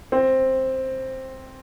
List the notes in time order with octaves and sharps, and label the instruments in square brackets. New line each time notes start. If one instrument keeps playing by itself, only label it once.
[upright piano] C4